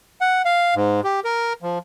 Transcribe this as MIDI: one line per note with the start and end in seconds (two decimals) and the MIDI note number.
0.21 0.42 78
0.45 0.74 77
0.75 1.01 44
1.04 1.20 67
1.25 1.53 70
1.62 1.78 53